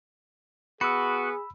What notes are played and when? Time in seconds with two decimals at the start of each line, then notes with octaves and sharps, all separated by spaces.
0.81 B3 F#4 G#4 B5 E6